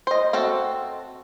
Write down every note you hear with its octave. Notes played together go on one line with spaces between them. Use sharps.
C5 D#5
C4 F#4 A4